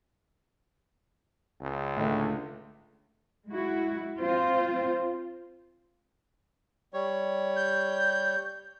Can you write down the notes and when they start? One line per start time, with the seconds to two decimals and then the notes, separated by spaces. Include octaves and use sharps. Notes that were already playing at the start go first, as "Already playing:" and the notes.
1.61 C#2
1.97 A2 D3 A3
3.48 G#3 E4 F#4
4.19 C4 F4 C5
6.94 G3 C#5
7.56 G6